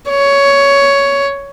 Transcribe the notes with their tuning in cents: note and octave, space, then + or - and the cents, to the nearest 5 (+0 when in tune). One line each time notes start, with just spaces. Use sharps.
C#5 +10